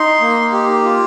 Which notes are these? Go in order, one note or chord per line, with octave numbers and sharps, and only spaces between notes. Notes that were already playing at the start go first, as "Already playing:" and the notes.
Already playing: D#4 C6
A#3
G4
F4